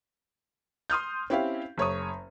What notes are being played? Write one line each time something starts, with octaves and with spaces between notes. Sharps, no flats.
C6 D#6 F6 G6
C4 C#4 E4 G4 C5 F5
F#1 C#5 C#6 D#6